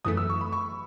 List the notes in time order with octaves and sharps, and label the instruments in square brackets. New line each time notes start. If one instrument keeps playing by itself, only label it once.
[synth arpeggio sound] G#1 F#2 E3 A3 [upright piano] D#6
[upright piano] E6
C#6
B5
C#6